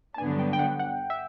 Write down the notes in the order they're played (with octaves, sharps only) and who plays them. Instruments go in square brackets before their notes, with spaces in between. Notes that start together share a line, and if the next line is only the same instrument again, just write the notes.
[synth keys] A5
[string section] G2 D3 F#3 B3 D4 [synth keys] G#5
[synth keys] G5
G5
F#5
F#5
E5